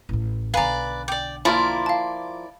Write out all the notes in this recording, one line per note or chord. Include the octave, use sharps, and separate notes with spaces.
A1 A2
B1 D3 B4 D5 F5 G#5 A#5
D5 G5 D6
F3 A#3 E4 F4 D5 B5
F5 A5